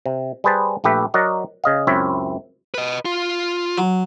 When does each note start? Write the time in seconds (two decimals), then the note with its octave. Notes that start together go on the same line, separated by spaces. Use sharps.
0.06 C3
0.44 G3 G#4 B4 C5 A5
0.84 A#1 A3 G4 B4 E5
1.14 F#3 F#4 A#4 D5 D#5 F#5
1.64 C#3 D#5 F5
1.87 C#2 F#2 C4 E4 C#5 E5
2.74 B4 D#5
3.05 F4
3.78 F#3